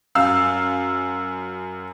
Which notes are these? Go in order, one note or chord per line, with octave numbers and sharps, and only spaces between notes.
F#2 F5 E6